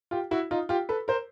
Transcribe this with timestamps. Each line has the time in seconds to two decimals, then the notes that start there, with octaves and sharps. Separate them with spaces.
0.11 F4 G4
0.31 E4 F#4
0.51 D#4 F4
0.69 F4 G4
0.89 A4 B4
1.08 A#4 C5